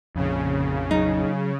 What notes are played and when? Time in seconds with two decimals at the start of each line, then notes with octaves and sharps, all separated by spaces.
0.16 A#1 F2 C#3
0.91 F#3 D#4